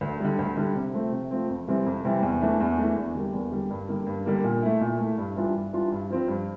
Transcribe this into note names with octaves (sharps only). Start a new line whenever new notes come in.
D2
D3 G3
D2
D3 G3
C3
F3 A3 C4
C3
F3 A3 C4
F2
C3 E3 G3 C4
F2
C3 E3 G3 C4
E2
E3 A3 D4
E2
E3 A3 D4
E2
D3 G3 A#3
E2
D3 G3 A#3
G2
D3 G3 A#3
G2
D3 G3 A#3
A#2
A3 E4
A#2
A3 E4
G2
E3 G3 D4 F4
G2
E3 G3 D4 F4
G2
F3 C4
G2